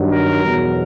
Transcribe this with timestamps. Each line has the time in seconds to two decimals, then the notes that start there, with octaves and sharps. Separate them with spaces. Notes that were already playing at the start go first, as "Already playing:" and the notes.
Already playing: G2 D#3 F#3
0.11 A#4
0.44 E2 B2 F#3